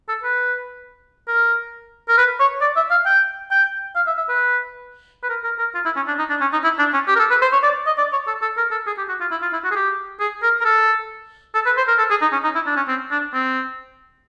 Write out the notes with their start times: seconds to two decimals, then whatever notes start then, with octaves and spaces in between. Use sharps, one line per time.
0.08 A4
0.23 B4
1.28 A#4
2.09 A#4
2.17 B4
2.40 C#5
2.61 D5
2.76 E5
2.91 F5
3.06 G5
3.51 G5
3.96 F5
4.07 E5
4.17 E5
4.29 B4
5.23 B4
5.29 A#4
5.44 A#4
5.59 A#4
5.74 F4
5.85 E4
5.96 C#4
6.07 D4
6.19 D#4
6.30 D4
6.41 C#4
6.53 D#4
6.64 E4
6.79 D4
6.93 C#4
7.08 G4
7.15 A#4
7.19 A4
7.30 B4
7.41 C5
7.52 C#5
7.63 D5
7.87 D#5
7.98 D5
8.13 C#5
8.27 A4
8.42 A4
8.57 A#4
8.71 A4
8.87 G#4
8.98 G4
9.09 F#4
9.20 F4
9.31 E4
9.42 F4
9.53 E4
9.64 F#4
9.71 G#4
9.76 G4
10.20 G#4
10.43 A#4
10.61 A#4
10.64 A4
11.54 A4
11.66 B4
11.77 C5
11.88 A#4
11.98 A4
12.10 G#4
12.21 D#4
12.32 C#4
12.44 D#4
12.55 E4
12.66 D4
12.77 C#4
12.88 C4
13.11 D4
13.33 C4